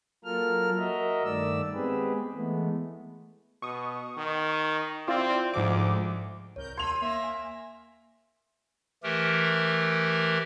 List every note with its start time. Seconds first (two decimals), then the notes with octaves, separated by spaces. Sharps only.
0.25 F#3 A#3 F4 A4 A#4 F6
0.78 F#4 A#4 D#5 E5
1.24 G2 D#3 A3 D5 E6
1.74 G#3 B3 C4 G4 G#4 B4
2.33 E3 G#3 A3 B3
3.62 B2 C#6 D#6
4.18 D#3
5.08 C4 E4 F4 D5
5.54 D2 G#2 F3 D6
6.56 C2 A#4 C#5 G6
6.78 D#2 C6 E6 G#6 D#7 F7
7.01 A#3 E5 A#6
7.24 G#5
9.03 E3 A3 G4 A#4